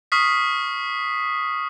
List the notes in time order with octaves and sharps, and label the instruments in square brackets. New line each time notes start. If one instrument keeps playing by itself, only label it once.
[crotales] C#6 D#6 F6 B6 C7